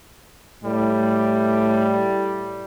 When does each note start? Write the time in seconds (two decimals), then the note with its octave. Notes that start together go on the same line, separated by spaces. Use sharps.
0.64 A2 G3